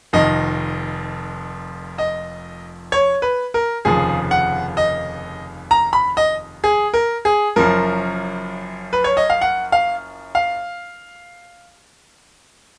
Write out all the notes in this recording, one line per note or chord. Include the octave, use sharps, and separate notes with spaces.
F1 F2 D#3 D#5
D#5
C#5
B4
A#4
F1 D#2 C#3 F3 G#4
F#5
D#5
A#5
B5
D#5
G#4
A#4
G#4
F#1 F#2 F3 A#4
B4
C#5
D#5
F5
F#5
F5
F5